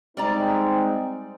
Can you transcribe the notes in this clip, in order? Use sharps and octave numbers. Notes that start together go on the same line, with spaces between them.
G3 G#3 C4 D#4 D5 A#5